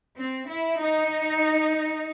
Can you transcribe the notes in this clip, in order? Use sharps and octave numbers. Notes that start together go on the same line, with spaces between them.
C4
E4
D#4